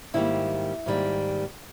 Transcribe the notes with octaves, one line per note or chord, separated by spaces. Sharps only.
G#2 D#3 G3 A#3 E4
G#2 D#3 G3 A#3